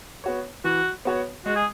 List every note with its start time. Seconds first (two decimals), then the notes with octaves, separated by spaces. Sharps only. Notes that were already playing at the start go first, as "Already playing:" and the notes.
0.24 B3 F#4 C#5
0.64 E3 F#4
1.05 B3 F#4 C#5
1.46 G#3 F#4
1.56 G#4